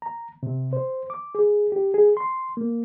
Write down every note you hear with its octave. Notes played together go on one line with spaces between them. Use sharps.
A#5
C3
C5
D6
G#4
G4
G#4
C6
A#3